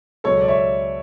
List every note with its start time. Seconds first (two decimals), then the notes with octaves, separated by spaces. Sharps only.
0.24 C#2 B2 F#3 A4 C#5
0.41 D5
0.48 C#5 E5